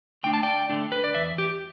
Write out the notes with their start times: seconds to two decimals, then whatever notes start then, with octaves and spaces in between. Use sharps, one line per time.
0.23 D3 A3 D4 G5
0.34 A5
0.43 D5 G5
0.69 D3 A3 D4
0.92 B4
1.04 D5
1.15 E2 E3 E5
1.38 G4